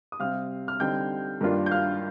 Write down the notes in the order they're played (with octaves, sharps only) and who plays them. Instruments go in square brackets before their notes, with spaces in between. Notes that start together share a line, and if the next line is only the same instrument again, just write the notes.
[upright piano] D#6
C3 G3 C4 F5 F6
F6
D3 G3 C4 D#4 G5 G6
G2 D#3 A#3 D4 F4
G6
F5 F6